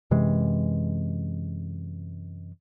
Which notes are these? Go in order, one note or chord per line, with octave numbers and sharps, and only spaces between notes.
F#2 C3 E3 G#3